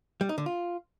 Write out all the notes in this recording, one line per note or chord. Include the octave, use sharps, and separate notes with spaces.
G3
D#4
D3
F4